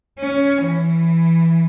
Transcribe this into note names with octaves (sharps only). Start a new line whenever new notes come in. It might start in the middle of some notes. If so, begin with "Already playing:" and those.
C#4
E3